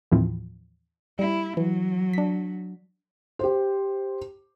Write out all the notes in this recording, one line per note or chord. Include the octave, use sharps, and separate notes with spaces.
D#2 A2 E3 F3 C4
G3 E4
E3 F#3
D4 B6
G4 C5